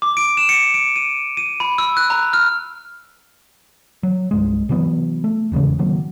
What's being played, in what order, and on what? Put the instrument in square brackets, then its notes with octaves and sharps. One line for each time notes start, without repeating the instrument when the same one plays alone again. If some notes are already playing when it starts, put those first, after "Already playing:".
[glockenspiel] D6
D7
E7
C#7
D7
D#7
D#7
B5
E6
F#6
A#5
F6
[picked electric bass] F#3
C2 G2 G#3
C3 E3 F#3 B3
A3
F1 E2 G#2 C#3
C3 D#3 F#3 A#3